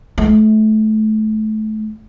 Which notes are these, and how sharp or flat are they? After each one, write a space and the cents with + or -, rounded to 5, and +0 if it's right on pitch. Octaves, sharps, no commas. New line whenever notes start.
A3 -25